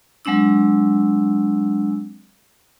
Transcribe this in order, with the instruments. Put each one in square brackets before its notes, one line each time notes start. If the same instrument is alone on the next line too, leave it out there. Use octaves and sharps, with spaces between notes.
[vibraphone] F#3 G#3 C4 D4 E6